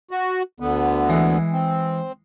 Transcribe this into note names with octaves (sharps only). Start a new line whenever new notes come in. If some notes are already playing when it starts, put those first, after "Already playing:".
F#4
D2 D3 B3
E3 G#3
C4